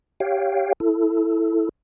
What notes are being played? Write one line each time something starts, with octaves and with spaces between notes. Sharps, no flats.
G4 C#5 F5 G5
E4 A4